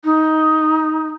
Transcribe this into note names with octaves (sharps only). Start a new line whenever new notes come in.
D#4